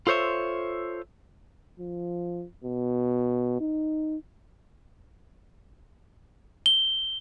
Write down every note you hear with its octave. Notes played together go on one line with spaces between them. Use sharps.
F4 A4 C5 C#5 E5
F3
B2
D#4
G7